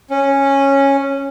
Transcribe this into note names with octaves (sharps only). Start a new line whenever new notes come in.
C#4